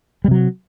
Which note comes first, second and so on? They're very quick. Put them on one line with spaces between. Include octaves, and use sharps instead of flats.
G3 C3 F#3